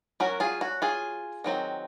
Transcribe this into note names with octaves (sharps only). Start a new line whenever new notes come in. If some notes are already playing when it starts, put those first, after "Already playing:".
F#3 C#4 F#4 A#4
F4 G#4
F#4
F4 G#4
D#3 F#3 C4